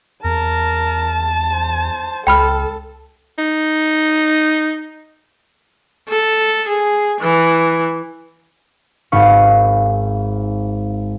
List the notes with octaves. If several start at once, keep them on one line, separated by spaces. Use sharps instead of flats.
E2 A#4 A5
C5
C#2 A4 G5 B5 F6
D#4
A4
G#4
E3
G#1 D#4 G#4 F5 B5 C#6